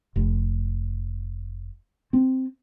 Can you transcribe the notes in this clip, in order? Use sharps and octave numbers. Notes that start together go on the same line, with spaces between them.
F1
C4